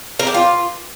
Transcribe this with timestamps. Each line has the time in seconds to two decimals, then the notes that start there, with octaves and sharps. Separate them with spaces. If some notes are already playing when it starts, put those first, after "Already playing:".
0.19 A#4
0.27 G4
0.34 F4